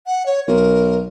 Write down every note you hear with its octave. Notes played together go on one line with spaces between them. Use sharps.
F#5
C#5
B1 A#4